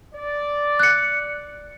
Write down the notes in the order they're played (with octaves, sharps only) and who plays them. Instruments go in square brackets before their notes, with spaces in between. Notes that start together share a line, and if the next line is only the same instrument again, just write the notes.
[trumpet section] D5
[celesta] F#6 C#7